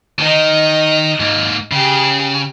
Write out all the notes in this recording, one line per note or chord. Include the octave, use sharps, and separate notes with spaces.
D#3 D#4 D#5
G#2 A#3
C#3 G4 G#4